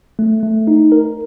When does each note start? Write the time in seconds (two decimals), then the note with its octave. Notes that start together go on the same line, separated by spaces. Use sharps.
0.19 A3
0.43 A3
0.67 D#4
0.92 A#4